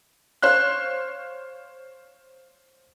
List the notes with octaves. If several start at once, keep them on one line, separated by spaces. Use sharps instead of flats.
C5 C#5 F5 F#6